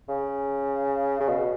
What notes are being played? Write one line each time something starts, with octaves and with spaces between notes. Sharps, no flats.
C#3
C#3
B2